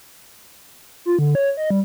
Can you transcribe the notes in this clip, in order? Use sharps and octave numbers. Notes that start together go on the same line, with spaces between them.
F4
D3
C#5
D#5
G3